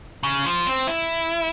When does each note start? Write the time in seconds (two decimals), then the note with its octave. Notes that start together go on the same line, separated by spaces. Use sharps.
0.23 C#3
0.46 F3
0.67 C4
0.87 E4